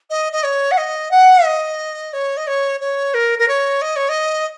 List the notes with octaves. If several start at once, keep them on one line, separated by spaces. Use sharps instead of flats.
D#5
D#5
C#5
F#5
D#5
F#5
D#5
C#5
D#5
C#5
C#5
A#4
A#4
C#5
D#5
C#5
D#5